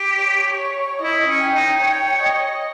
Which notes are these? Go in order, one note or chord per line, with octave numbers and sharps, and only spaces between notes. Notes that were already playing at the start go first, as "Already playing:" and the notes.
Already playing: G4
C#5
E4 D#5
C#4
G5
D#4
C#5 G5
D#5